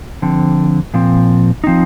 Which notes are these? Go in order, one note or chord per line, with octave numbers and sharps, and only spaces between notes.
D3 F3 C4
A#2 F3 C4
F3 C4 D#4